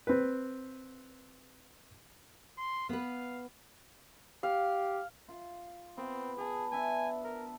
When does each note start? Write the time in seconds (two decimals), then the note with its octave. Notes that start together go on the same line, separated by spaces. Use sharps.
0.07 C4 B4
2.58 C6
2.89 B3 B4 F5
4.43 G4 F5
5.28 F4
5.98 B3 C4
6.37 G#4 G5 A5
6.72 B3 D4 E5 G#5
7.24 A#4